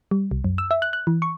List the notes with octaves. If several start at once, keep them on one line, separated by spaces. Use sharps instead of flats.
G3
C2
F#2
E6
E5
F#6
F#6
E3
C#6